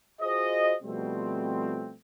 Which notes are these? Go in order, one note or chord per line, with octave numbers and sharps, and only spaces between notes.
F4 F#4 G#4 C5 D#5
B2 F3 G3 A3 C4